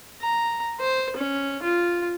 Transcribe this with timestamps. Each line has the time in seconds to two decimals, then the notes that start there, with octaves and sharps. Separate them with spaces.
0.21 A#5
0.80 C5
1.17 C#4
1.63 F4